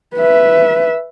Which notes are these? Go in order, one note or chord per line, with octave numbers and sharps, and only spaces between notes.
B4 E5